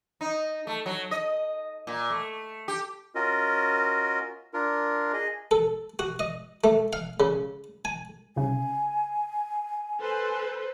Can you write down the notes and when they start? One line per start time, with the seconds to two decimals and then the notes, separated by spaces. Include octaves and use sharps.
0.21 D#4
0.67 A3
0.86 F#3
1.11 D#5
1.87 A#2
2.10 A3
2.68 G4
3.15 C#4 F4 F#4 A#4 D#5
4.54 D4 F4 A#4
5.13 G#4 D#5
5.51 A4
5.99 F#4
6.19 D#5
6.64 A3
6.93 F5
7.20 C#3
7.85 G#5
8.36 C2 C#3 G#5
10.00 A4 B4 C5